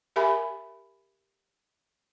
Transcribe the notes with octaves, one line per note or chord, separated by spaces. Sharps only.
G4 A#4 E5 G#5 B5